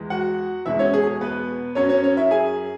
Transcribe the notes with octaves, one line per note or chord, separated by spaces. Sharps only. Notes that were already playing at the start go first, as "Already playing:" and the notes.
Already playing: E2 E3 G#3
F#4 F#5
E2 B2 G#3 E4 E5
C#4 C#5
G#4
G#4
B3 B4
F#2 F#3 C#4 C#5
C#4 C#5
C#4 C#5
E4 E5
G#4 G#5